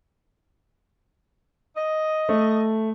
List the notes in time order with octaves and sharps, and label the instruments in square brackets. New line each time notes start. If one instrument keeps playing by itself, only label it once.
[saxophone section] D#5
[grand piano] A3